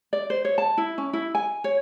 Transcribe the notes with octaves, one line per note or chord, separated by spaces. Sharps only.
D5
C5
C#5
A5
E4
C#4
E4
G#5
C#5